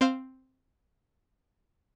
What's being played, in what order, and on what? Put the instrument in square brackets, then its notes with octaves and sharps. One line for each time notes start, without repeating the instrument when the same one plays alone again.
[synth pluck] C4 C5 F5